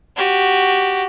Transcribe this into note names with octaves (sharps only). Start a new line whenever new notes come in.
F#4 G4